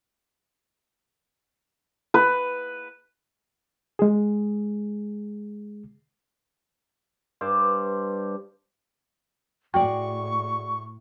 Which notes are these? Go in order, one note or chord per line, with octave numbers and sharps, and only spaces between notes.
B4
G#3 G#4
G2 C5 D5
A2 F#4 G#4 D5 G5 C#6